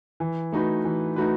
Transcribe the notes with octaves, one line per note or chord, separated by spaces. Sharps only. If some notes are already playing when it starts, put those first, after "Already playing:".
E3
A3 D#4 F#4 B4
E3
A3 D#4 F#4 B4